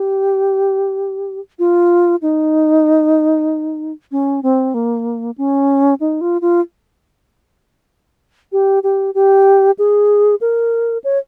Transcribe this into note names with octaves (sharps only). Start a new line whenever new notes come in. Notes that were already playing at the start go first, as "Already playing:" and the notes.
Already playing: G4
F4
D#4
C#4
C4
A#3
C#4
D#4
F4
F4
G4
G4
G4
G#4
A#4
C#5